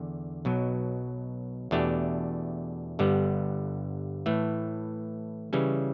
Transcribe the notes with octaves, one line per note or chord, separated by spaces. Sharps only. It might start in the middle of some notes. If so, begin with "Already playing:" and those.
Already playing: E2 D3
B1 B2 F#3
E2 B2 A3 D4 G4
G1 G2 D3 G3 B3
A2 E3 A3
C#3 E3 G3 C#4